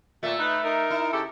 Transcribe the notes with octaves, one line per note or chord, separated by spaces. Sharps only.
A#2 A3 E5
D#4 B4
D#4 A#4
E4
C#3 G4 A4